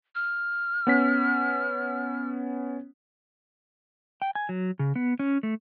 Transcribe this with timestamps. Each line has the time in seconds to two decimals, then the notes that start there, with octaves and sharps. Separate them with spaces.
0.15 F6
0.87 B3 C#4 B6
4.22 G5
4.35 G#5
4.49 F#3
4.79 C#3
4.96 B3
5.19 C#4
5.43 A3